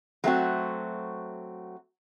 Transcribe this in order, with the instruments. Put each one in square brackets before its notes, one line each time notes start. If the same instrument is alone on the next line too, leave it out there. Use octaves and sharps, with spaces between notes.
[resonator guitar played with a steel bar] F#3 A3 C4 F#4